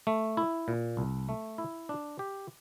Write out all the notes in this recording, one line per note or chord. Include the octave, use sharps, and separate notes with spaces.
A3
E4
A#2
C2
A3
E4
D4
G4